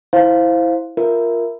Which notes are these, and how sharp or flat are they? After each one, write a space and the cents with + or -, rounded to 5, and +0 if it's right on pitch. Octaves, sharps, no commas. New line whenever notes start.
E4 -5 C5 +0 F5 +0
F4 +0 A#4 +0 E5 +0